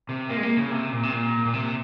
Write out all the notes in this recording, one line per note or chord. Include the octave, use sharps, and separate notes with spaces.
C3
A#3
G#3
A#3
C#3
C3
A#2
C3
A#2
A#2
C3